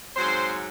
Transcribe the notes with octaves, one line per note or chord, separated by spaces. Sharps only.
G#2 F#3 C4 C5